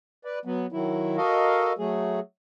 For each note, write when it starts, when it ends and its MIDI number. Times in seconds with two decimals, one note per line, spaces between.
0.25 0.39 71
0.25 0.39 74
0.45 0.66 54
0.45 0.66 59
0.72 1.16 51
0.72 1.16 54
0.72 1.16 64
1.17 1.73 66
1.17 1.73 69
1.17 1.73 70
1.17 1.73 75
1.17 1.73 77
1.78 2.20 54
1.78 2.20 57
1.78 2.20 68